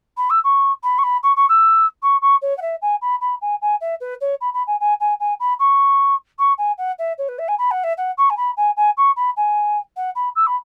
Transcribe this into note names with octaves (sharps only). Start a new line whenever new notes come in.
B5
E6
C#6
B5
C#6
B5
C#6
C#6
E6
C#6
C#6
C#5
F#5
E5
G#5
B5
B5
G#5
G#5
E5
B4
C#5
B5
B5
G#5
G#5
G#5
G#5
B5
C#6
C#6
G#5
F#5
E5
C#5
B4
E5
G#5
B5
F#5
E5
F#5
C#6
G#5
B5
G#5
G#5
C#6
B5
G#5
F#5
B5
E6
B5